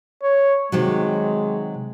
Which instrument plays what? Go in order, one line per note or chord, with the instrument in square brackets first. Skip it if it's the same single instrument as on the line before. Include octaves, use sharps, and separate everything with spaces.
[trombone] C#5
[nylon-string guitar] C3 D#3 F#3 [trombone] G#3